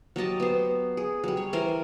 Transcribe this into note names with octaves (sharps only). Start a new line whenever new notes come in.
F#3 G4 D#5 A5
B3 C5
G#4
F#3 G3
C#5
E3 A#4 C5 G#5